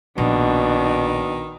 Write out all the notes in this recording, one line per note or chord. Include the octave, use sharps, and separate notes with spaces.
A#1 B2 D#3 D4